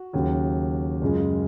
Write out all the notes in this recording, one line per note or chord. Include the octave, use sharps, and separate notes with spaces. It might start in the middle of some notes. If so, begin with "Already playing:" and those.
Already playing: F#4
D#2 C#3 F#3
F#2 C#3 G#3 F4